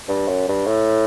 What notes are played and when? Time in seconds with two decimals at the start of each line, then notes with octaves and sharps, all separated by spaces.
0.09 G2
0.28 F#2
0.49 G2
0.67 A2